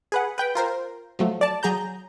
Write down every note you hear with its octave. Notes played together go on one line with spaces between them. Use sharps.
G#4 B4 F#5
B4 G5
F4 A#4 C5
F3 F#3 A3
D5 A5
F#3 G#4 A#5 G6